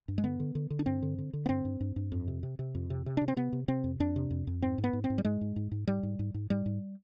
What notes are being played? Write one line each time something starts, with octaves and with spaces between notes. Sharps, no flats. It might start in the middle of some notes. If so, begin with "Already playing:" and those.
G2
G#3
D3 B3
D3
D3
D3
D4
G2 C4
D3
D3
D3
B3
G2 C4
G2
G2
G2
F2
C3
C3
C3
F2
C3
C3
C3 D4
C4
C3 B3
C3
C3 C4
F2
F2 D4
C3
F2
F2
G#2 C4
G#2
B3
G#2
C4
G#2
G3
G#2 G#3
G#2
G#2
G#2
G#2 G3
G#2
G#2
G#2
G#2 G3
G#2